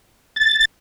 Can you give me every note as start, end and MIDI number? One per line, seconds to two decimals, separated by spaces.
0.36 0.65 93